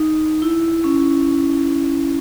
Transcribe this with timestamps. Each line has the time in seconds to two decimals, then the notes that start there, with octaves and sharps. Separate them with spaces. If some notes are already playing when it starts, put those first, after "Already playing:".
Already playing: D#4
0.42 E4
0.84 C#4